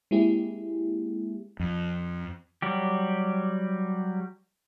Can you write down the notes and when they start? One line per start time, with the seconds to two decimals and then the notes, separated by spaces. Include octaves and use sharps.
0.11 G#3 A#3 C4 E4 G4 G#4
1.60 F2
2.62 F#3 G3 G4